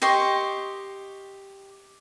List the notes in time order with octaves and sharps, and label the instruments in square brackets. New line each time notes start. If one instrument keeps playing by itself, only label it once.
[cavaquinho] G4 D#5 C6 C#6